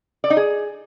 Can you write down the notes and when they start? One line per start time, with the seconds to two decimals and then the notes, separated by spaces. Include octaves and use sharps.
0.24 D5
0.30 D#4
0.37 G#4